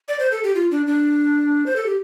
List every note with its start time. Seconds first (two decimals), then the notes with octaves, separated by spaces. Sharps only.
0.08 D5
0.20 C5
0.31 A4
0.44 G4
0.55 F4
0.71 D4
0.87 D4
1.66 C5
1.76 A4
1.86 G4